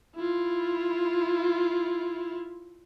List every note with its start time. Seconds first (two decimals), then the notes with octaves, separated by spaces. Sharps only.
0.16 E4 F4